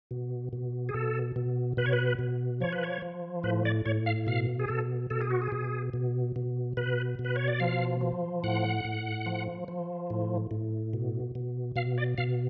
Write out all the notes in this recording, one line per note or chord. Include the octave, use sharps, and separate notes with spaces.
B2
B2
G#4
B2 A4
B2
B2 B4
C#5
B4
B2
F3 C#5
B4
C#5
F3
A2 B4
D5
A2 C#5
F5
B2 F5
G#4
B2 A4
B2 A4
G#4
F#4
G#4
B2
B2
B2
B2 B4
B2
B4
C#5
D5
F3 F5
F3
A2 F#5
A2
F3
F3
A2
A2
B2
B2
B2 F5
D5
B2 F5